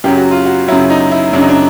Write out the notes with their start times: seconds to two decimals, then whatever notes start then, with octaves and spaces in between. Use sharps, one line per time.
0.04 F#2 C#3 F#3 G4
0.17 F#4
0.31 F4
0.45 F#4
0.68 F#2 C#3 F#3 E4
0.90 D#4
1.11 E4
1.33 F#2 C#3 F#3 D4
1.41 D#4
1.49 D4